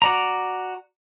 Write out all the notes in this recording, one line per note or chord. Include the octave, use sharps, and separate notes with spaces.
F#4 D5 A#5